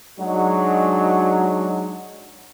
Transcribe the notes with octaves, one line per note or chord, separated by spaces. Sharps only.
F#3 G#3 D4 D#4 F#4